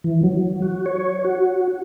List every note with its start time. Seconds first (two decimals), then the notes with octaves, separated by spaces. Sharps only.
0.04 E3
0.23 F#3
0.62 F#4
0.86 C#5
1.24 F#4